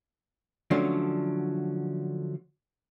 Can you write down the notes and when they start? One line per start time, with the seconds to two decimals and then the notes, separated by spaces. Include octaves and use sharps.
0.71 D3 F3 F#3 A3 C#4 D4